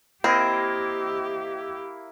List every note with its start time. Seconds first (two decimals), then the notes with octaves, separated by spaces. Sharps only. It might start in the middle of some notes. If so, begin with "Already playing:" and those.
0.24 A#3 C4 E4 G4 D#5